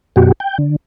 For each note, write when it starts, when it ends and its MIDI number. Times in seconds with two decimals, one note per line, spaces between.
0.16 0.32 42
0.16 0.32 47
0.16 0.32 66
0.16 0.32 67
0.40 0.58 79
0.58 0.76 50